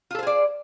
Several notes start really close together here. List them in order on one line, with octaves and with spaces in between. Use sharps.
F4 A4 C5 G#4 D5